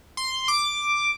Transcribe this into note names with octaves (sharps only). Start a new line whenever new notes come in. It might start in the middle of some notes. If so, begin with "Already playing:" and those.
C6
D6